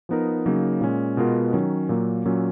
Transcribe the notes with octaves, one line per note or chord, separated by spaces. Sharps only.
F3 B3 D#4 A#4
C#3 F#3 A#3 D#4
A#2 G#3 C#4
B2 G#3 B3 F4 A#4
D#3 F#3 C#4
A#2 F#3 A#3
A#2 F#3 C#4